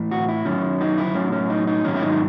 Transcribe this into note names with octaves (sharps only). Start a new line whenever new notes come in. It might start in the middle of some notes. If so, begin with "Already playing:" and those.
Already playing: A2 E3
F#4
E4
F#2 D#3 F#3 C#4
D#4
E4
A2 F#3 C#4
C#4
D#4
D#4
G#2 D#3 F#3 C#4
E4
D#4